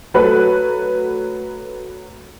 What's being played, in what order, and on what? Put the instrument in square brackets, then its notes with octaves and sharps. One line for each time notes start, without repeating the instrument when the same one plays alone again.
[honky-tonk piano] F#3 A3 F#4 A4 B4